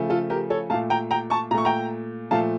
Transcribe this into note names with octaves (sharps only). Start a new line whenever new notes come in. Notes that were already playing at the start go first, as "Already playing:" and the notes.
Already playing: C#3 F3 A3
F4 A4
G4 A#4
A4 C#5
A#2 A3 F5 A5
G5 A#5
G5 A#5
A5 C#6
A#2 A3 A#5 C#6
G5 A#5
A#2 F3 A3 F5 A5